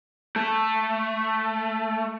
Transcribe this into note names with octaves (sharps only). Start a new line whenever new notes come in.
A3